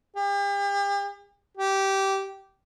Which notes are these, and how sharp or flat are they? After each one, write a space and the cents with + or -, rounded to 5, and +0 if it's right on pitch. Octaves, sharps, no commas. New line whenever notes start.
G4 +40
G4 -15